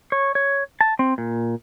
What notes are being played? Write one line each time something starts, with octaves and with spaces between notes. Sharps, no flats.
C#5
C#5
A5
C4
A#2